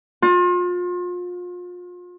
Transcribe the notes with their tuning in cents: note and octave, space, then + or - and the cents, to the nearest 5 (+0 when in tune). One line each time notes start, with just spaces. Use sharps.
F4 +35